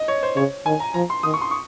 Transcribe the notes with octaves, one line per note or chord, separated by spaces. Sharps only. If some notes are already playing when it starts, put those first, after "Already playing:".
Already playing: D#5
C#5
C5
C#3 C#5
D#3 G#5
A#5
F3 A#5
C6
D#3 D#6
C#6
C6
C#6